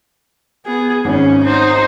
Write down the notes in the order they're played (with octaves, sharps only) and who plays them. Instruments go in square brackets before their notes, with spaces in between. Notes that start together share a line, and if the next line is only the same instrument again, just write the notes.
[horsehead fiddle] B3 G#4
[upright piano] G#1 [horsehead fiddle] C#4
[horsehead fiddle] D#4 C5